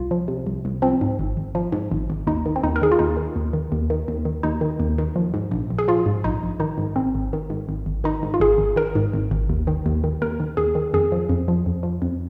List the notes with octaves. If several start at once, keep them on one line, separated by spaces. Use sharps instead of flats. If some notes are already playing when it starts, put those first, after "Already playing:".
Already playing: C2 F4
F3
C3
C2
C2
F3 C4
G#2
G#1
G#1
F3
G#2
G#1
G#1
D#2 D#4
D#3
C4
D#2 D#4
A#4
D#3 G#4
F4
D#2 D#4
D#3
D#2
D#3
D#2
D#3
D#2
D#3
D#2 D#4
D#3
D#2
D#3
F3
G#2
A#1
A#1
G#4
F3 F4
G#2
A#1 D#4
A#1
D#3 D#4
G#2
G#1 C4
G#1
D#3
G#2
G#1
G#1
D#3 D#4
G#2
F4
G#1 G#4
G#1
D#3 A#4
G#2
G#1
G#1
D#2
D#3
D#2
D#3
D#2 A#4
D#3
D#2 G#4
D#3
F2 G#4
F3
F2
F3
F2
F3
F2